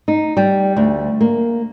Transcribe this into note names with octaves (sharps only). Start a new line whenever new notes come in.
D#4
G3
D2
A#3